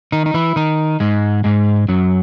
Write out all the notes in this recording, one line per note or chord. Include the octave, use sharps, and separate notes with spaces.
D#3 D#4
D#4
E3 E4
D#3 D#4
G#2 G#3
G#2 G#3
F#2 F#3